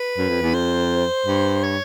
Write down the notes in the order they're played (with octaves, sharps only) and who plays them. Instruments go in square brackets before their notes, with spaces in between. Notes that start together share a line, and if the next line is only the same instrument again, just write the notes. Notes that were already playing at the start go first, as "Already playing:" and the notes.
Already playing: [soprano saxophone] B4
[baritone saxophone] F#2
F2
E2
[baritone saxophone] F2 [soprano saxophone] C5
[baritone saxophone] G2
[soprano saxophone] C#5